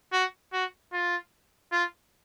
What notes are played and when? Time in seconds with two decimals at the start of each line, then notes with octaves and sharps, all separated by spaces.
0.12 F#4
0.53 F#4
0.92 F4
1.72 F4